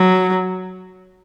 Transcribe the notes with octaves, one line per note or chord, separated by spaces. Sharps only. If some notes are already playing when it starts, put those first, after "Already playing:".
Already playing: F#3